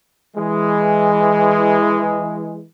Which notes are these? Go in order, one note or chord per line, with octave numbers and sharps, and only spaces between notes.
E3 G#3